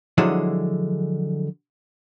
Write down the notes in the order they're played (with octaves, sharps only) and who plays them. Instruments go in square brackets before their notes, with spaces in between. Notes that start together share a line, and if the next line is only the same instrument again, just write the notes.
[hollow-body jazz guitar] D3 F3 F#3 G#3 E4 G#4